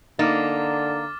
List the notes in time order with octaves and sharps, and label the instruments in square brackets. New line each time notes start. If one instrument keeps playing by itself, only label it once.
[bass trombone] D3 [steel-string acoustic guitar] A#3 [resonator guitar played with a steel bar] D#4 [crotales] D6 F6 A6